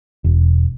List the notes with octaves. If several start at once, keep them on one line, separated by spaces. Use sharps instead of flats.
E1